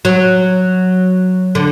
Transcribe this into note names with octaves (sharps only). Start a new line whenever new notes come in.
F#3
D3